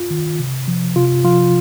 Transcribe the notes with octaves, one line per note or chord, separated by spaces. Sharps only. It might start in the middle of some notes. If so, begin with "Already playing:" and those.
Already playing: F4
D#3
C3
F3
C3 F4
F3 F4